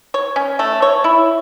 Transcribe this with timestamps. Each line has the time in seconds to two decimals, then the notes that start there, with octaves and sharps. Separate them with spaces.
0.14 C#5
0.36 C#4
0.59 A3
0.82 C#5
1.04 E4